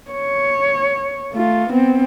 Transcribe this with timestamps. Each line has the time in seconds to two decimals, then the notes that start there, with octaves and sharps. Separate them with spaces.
0.11 C#5
1.33 A3 F4
1.70 B3 C4